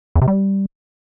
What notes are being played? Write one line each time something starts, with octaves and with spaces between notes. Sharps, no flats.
E2
C3
G3